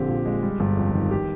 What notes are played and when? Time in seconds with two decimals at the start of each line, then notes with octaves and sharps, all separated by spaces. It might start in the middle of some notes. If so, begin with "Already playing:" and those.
Already playing: A#1 D3 C4 G4
0.08 A#2
0.25 G#3
0.43 G3
0.60 G1
0.77 F2
0.94 D#3
1.11 G4